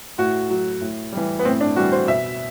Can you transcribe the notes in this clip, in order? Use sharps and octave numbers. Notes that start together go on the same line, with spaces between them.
A2 F#4
F#3
A2
E3 G3
B3
A2 C4
D4
E3 G3 F#4
C5
B2 E5